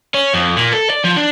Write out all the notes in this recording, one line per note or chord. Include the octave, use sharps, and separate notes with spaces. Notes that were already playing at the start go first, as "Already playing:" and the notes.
C#4
F2
A#2
A4
D5
F3
D4